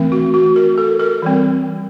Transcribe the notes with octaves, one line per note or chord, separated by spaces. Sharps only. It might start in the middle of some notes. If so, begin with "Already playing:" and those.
Already playing: E3 A3 C4
F#4
F#4
A#4
A4
A#4
E3 G3 C4